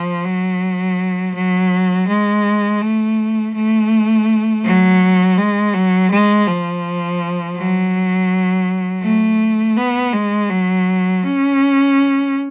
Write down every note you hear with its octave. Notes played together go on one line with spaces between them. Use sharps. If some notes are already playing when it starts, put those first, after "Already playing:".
Already playing: F3
F#3
F#3
G#3
A3
A3
F#3
G#3
F#3
G#3
F3
F#3
A3
B3
G#3
F#3
C#4